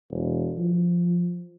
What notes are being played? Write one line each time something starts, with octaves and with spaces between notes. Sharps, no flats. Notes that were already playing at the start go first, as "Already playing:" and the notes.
E1
F3